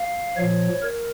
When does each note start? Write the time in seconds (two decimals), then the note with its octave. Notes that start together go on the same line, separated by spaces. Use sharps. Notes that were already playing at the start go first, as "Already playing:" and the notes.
Already playing: F5
0.37 A#2 F3 C#5
0.82 A#4